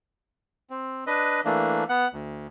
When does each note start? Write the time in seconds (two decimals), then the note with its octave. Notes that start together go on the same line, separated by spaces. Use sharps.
0.70 C4
1.07 D4 B4 D#5
1.45 E3 A3 A#3 D4
1.89 B3 F#5
2.13 D2